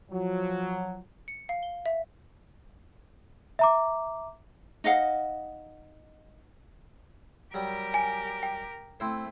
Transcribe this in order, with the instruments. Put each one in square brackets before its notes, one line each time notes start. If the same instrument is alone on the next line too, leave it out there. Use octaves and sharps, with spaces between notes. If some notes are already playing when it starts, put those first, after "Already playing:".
[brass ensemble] F3 F#3
[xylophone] C#7
F5
G7
E5
[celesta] E5 A#5 D6
[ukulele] D#4 D#5 F5 F#5
[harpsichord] F#3 G3 [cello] G4 A#4
[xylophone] G#5
G5
[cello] A3 [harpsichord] C4 E4 C5